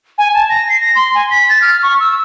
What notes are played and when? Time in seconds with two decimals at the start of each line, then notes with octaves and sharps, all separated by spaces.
0.18 G#5
0.34 A5
0.49 A#6
0.69 C7
0.80 A#6
0.95 C6
1.15 G#5
1.30 B6
1.49 A6
1.62 F6
1.83 C#6
2.00 E6